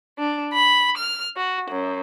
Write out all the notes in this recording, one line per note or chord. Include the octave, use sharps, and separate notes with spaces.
D4
B5
F6
F#4
F#2